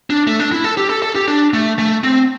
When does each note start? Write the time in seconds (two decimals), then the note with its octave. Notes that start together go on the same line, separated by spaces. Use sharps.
0.10 D4
0.27 A3
0.39 D4
0.52 E4
0.64 A4
0.77 G4
0.90 A4
1.02 A4
1.16 G4
1.28 D4
1.54 A3
1.79 A3
2.04 C4